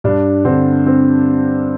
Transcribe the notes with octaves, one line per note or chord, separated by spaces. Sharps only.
G2 D4
D3 C4
C4